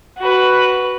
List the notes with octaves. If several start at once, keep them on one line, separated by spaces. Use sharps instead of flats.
F#4 B4